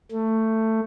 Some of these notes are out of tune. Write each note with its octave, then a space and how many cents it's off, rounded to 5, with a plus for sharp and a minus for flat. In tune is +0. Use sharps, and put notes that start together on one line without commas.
A3 +15